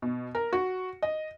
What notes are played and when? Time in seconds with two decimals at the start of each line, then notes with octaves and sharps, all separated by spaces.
0.02 B2
0.35 A#4
0.53 F#4
1.02 D#5